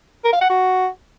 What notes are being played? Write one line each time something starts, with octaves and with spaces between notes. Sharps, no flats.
A#4
F5
F#5
F#4